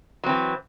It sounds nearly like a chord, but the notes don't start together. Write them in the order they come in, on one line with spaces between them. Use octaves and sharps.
F#3 C4 E3